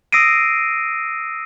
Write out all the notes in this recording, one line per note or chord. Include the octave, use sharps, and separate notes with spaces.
D#6 E6 A#6 C7 D7 D#7